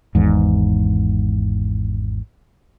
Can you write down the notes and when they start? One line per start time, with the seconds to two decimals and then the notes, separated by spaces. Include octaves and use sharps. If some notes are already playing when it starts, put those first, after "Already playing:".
0.15 G#1 E2 G#2